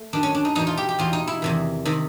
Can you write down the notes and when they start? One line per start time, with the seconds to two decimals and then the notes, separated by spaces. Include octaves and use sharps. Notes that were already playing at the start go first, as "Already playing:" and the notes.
Already playing: A3
0.13 F#2 D#3 D4
0.23 C#4
0.35 D4
0.45 D#4
0.55 E2 B2 D#4
0.67 F4
0.77 G4
0.89 G4
0.99 E2 B2 F4
1.13 D#4
1.28 E4
1.42 E2 C3 D#3
1.85 C3 D#3